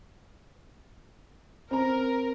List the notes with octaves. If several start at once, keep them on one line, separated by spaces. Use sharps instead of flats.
C4 A#4 A#5